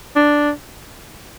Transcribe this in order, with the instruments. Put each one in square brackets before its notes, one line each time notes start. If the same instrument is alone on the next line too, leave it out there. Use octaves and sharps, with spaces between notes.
[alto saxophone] D4